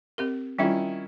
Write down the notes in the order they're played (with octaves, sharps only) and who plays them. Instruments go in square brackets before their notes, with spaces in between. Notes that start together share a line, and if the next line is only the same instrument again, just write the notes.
[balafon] C4 G4 A#4
[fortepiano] D#3 C#4 E4 [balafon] G3 F4